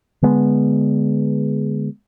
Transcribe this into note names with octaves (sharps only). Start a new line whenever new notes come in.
D3 G#3 B3